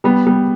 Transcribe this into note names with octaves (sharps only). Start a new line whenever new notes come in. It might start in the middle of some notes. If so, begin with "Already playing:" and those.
G3 B3
G3 B3